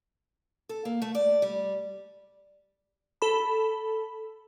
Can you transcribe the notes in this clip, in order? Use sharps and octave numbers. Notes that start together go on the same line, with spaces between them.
A4
A#3
A3
D5
G3
A4 B5